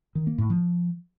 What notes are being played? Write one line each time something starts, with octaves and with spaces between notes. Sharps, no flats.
D#3
A#3
A2
F3